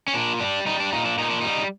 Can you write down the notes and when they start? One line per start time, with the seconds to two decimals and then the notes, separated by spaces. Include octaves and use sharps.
0.08 C#4
0.14 A#2 D4
0.40 G3 D4
0.66 G3 D#4
0.80 D4
0.92 A#2 D#4
1.05 D4
1.18 A#2 D#4
1.30 D4
1.41 G3 D#4